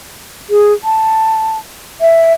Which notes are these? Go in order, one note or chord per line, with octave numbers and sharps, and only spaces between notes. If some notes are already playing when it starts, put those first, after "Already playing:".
G#4
A5
E5